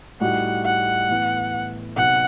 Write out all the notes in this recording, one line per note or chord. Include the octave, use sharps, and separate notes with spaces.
A2 G3 D#4 F#4 F#5
F#5
A2 E3 B3
C3 F#3 B3 D#4 F#5